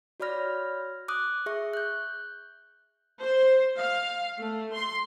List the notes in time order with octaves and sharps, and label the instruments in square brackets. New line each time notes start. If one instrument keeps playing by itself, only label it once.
[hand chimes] F#4 C#5 D5 B5 F6 A#6
D6 D#6 F#6
G#4 E5 C#6
F#6 G6
[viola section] C5
F5
A3
C6